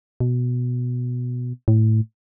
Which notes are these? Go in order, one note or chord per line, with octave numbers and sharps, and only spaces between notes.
B2
A2